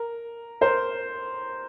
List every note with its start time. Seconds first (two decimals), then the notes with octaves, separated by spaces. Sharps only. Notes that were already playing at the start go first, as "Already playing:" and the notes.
Already playing: A#4
0.61 A#4 C5